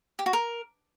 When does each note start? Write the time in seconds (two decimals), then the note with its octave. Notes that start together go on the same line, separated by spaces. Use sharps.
0.19 G4
0.26 F#4
0.33 A#4